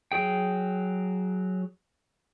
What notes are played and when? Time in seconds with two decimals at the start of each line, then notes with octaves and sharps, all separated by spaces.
0.12 F#3 G#4 G5